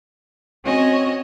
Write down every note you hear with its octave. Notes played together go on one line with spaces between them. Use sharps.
C4 C#4 F#4 C#5 D#5 G#5